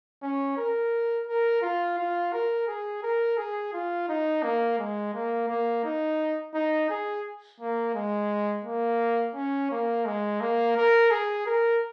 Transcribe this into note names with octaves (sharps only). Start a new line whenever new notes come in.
C#4
A#4
A#4
F4
F4
A#4
G#4
A#4
G#4
F4
D#4
A#3
G#3
A#3
A#3
D#4
D#4
G#4
A#3
G#3
A#3
C#4
A#3
G#3
A#3
A#4
G#4
A#4